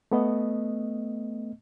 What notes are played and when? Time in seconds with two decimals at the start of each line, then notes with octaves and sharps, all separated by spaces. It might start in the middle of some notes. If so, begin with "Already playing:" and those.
0.11 A3 B3 D#5